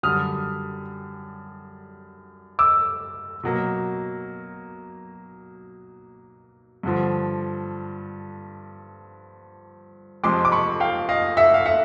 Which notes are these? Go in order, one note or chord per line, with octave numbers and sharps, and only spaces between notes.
F#2 D3 G3 D#6 F6
D6 E6
B2 F#3 A#3
G2 D3 F3
F2 C3 F3 G#3 C6 D6
D6
B5 C#6
F5 G5
D#5 F5
E5 F#5
F5
E5 F#5